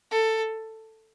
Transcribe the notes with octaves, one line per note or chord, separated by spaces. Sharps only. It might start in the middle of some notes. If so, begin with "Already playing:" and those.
A4